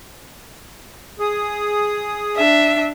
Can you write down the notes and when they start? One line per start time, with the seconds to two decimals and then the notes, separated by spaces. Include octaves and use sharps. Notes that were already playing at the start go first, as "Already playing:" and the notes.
1.20 G#4 D#6
2.37 D4 E5